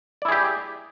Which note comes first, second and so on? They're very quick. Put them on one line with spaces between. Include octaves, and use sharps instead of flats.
D5 E4 G#4 G4